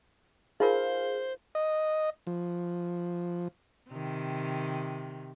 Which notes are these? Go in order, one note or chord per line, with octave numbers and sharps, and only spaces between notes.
D#4 F4 G#4 A#4 C5 F5
D#5
F3
C3 D#3